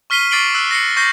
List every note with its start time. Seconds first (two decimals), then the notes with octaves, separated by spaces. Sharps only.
0.10 C#6 F6 B6 C7 D#7 G7
0.31 C#6 D6 A6 C7 D7 F#7
0.54 E6 F#6
0.71 A#6 C7 C#7
0.96 C#6 G6 A#6 C7